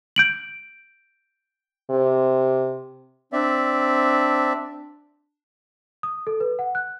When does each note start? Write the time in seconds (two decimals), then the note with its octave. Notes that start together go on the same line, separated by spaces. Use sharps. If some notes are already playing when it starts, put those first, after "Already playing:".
0.16 G6 D7 F#7
1.91 C3
3.33 C4 D4 D5 E5
6.03 D#6
6.27 A4
6.40 B4
6.59 F#5
6.75 F#6